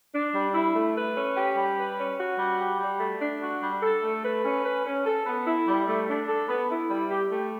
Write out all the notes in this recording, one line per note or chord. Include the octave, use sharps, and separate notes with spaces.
D4
G3
E4
A3
B4
C#4
G4
G3
B4
C#4
F#4
G3
G4
G3
A3
D4
F#4
G3
A4
A3
B4
C#4
B4
C#4
A4
B3
E4
G3
A3
D4
A4
B3
E4
G3
G4
A3